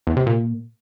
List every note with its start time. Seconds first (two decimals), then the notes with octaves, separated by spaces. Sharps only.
0.07 E2
0.17 C3
0.26 A#2